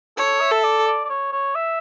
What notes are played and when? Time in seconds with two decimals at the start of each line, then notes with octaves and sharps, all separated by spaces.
0.17 A4 C#5
0.41 E5
0.51 A4
0.64 D5
0.87 D5
1.05 D5
1.09 C#5
1.32 C#5
1.55 E5